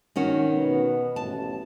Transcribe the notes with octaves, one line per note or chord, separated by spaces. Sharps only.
D#3 C#4 F#4
B2 B3
A1 A2 A5